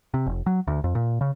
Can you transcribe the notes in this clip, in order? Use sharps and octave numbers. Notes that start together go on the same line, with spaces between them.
C3
F1
F#3
D2
F2
A#2
C#3